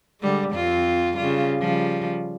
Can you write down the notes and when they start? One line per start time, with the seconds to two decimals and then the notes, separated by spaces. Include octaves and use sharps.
0.21 D3 G3 G#3
0.51 F2 C4 F4
1.17 C#3 G3 F4
1.59 C#3 F3 G3